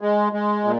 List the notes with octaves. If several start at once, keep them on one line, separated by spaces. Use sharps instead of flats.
G#3
G#3
A#2